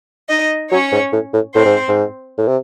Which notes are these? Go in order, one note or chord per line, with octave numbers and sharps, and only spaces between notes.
D#4 D#5
F#3 C#4 C#5
G#2
A2
A2
A2 C4 C5
G#2
G#2
A2
C3